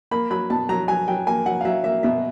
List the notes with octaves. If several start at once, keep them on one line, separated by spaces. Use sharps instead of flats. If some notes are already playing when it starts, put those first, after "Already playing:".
A#3 B5
F#3 B5
B2 A5
F#3 A#5
F#3 G#5
F#3 G5
A#3 G#5
F#3 F#5
F5
F#3 E5
A#3 E5
B2 E5